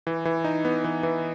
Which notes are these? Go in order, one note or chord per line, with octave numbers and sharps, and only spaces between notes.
E3
E3
D#4
B3
E3
E3